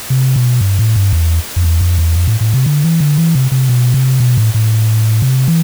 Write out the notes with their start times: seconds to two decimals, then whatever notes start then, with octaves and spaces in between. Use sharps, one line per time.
0.10 C3
0.36 B2
0.61 G2
0.79 A2
0.96 G2
1.13 E2
1.56 F2
1.64 E2
1.81 F2
1.98 E2
2.15 F2
2.27 A2
2.41 A2
2.54 C3
2.66 D3
2.84 E3
3.00 D3
3.18 E3
3.35 C3
3.52 C3
3.69 B2
3.94 C3
4.20 B2
4.37 A2
4.54 A2
5.22 C3
5.48 E3